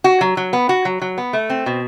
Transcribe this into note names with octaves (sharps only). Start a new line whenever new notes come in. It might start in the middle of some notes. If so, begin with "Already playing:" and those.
F#4
F#3
F#3
B3
F#4
F#3
F#3
B3
A3
C4
B2